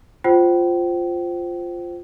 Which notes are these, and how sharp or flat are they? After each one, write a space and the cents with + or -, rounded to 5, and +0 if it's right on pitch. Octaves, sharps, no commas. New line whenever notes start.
F4 +0 C5 +0 G5 -35